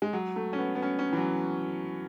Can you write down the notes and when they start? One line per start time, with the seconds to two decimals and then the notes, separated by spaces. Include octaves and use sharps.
0.02 G#3
0.13 F#3
0.36 A3
0.53 C#4
0.59 B3
0.75 B3
0.82 C#4
0.99 C#4
1.13 E3
1.17 F#3